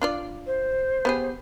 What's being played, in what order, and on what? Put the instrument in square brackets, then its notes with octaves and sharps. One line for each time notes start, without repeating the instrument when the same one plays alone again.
[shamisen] D4 F4 D5
[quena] C5
[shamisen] B3 G4 G#4